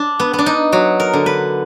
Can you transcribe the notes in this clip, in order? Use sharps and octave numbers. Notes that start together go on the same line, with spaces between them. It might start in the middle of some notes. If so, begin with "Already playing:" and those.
Already playing: D4
B3
B3
D4
D#4
F#3 F#4
A#4
D3
B4